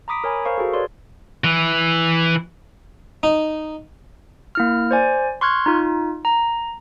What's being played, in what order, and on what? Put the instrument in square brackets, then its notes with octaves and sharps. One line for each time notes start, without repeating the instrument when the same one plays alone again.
[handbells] A#5 B5 D6 D#6 B6 D7
A#4 C#5 G#5 A#5 B5
A#4 C5 F5 C#6
F#4 G#4 A4
B4 C#5 D5 C6
[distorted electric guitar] E3
[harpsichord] D#4
[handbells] A#3 E4 F6
C5 D5 G#5
C6 C#6 F6 F#6 G#6
D#4 F4
A#5